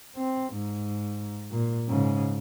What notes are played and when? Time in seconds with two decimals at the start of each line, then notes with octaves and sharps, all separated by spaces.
0.16 C4
0.53 G#2
1.51 A#2
1.88 G#2 C#3